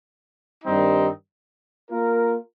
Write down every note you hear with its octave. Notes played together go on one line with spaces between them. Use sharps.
G2 D#3 G3 C4 D#4
A#3 F4 A#4